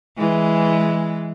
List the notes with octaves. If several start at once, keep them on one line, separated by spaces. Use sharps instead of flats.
E3 G#3